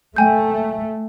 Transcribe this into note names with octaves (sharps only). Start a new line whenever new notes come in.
A3 G5 G#5 G6